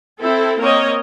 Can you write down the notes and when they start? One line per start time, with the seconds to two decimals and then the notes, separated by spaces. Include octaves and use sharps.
0.21 C4 E4 A4
0.60 A#3 C4 A#4 C#5 D#5